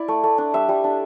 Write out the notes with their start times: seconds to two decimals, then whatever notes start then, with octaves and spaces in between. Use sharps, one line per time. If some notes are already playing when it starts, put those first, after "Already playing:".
Already playing: E4 D5
0.08 A3
0.24 A3
0.38 D4
0.54 G3 E5
0.69 G3
0.84 D4